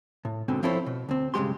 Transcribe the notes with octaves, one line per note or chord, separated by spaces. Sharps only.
A2
G#2 B2 D3 C4
F3 C4 E4 A4 C5 C#5
B2
D2 C4
B1 G2 C#3 G#3 G4 C6